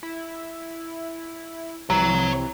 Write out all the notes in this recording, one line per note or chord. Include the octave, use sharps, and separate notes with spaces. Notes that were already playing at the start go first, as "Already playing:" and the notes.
E4
C2 C3 E3 C#5 A#5